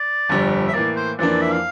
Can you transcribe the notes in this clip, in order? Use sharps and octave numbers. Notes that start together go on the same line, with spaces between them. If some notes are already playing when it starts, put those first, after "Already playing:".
Already playing: D5
G1 F2 D3 G3
E5
A2 E3 A#3 D5
C5
F2 E3 A#3 D4 D5
D5
E5
F5